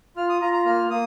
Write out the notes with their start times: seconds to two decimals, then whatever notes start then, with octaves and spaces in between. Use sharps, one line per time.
0.17 F4 F6
0.29 D#6
0.41 F4 A#5
0.53 A#5
0.66 A#3 F6
0.90 A#3 D#6